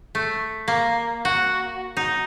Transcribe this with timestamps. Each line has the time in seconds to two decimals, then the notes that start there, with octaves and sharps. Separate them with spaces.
0.15 A3
0.68 A#3
1.25 F#4
1.97 D#4